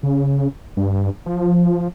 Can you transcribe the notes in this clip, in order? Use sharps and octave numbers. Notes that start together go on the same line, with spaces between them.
C#3
G2
F3